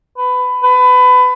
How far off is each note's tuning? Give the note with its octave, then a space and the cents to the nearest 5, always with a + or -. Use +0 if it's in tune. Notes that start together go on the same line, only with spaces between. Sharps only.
B4 +20
B4 +25